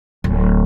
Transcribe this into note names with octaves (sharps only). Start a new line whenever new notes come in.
D1